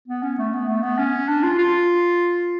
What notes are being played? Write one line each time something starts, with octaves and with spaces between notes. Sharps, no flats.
B3
C#4
A3
B3
A3
B3
C#4
D4
F4
F4